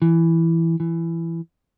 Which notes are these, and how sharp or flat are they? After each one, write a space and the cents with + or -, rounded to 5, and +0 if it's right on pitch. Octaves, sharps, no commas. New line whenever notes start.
E3 +5
E3 +15